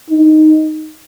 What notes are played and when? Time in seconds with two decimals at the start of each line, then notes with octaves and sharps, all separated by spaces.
0.10 D#4